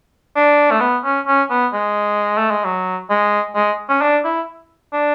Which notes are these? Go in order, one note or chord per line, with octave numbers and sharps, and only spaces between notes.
D4
A3
B3
C#4
C#4
B3
G#3
A3
G#3
F#3
G#3
G#3
C#4
D4
E4
D4